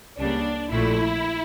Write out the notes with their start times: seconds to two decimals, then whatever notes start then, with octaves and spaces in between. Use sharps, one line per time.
0.18 C#2 C#3 G3 A#3 D4
0.71 A#1 A#2 A3 E4